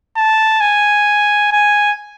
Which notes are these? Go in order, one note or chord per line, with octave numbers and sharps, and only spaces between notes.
A5
G#5
G#5